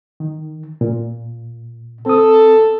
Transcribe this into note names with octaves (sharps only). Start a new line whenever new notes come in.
D#3
A#2
C4 A4 D#6